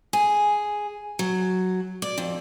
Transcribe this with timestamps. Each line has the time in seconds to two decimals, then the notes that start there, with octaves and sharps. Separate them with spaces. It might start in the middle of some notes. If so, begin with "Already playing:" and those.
0.13 G#4
1.19 F#3
2.02 D5
2.18 F2